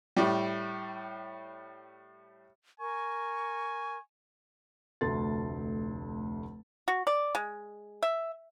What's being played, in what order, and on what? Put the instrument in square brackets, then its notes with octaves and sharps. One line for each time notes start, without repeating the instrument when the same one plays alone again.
[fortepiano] A2 G3
[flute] A#4 [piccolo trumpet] G#5 [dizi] C#6
[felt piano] F1 D2 A3 C6 A6
[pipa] F#4
D5
G#3
E5